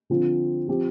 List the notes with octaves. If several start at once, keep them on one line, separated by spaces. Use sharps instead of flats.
D3 F3 C4 F4
F3 C4 G4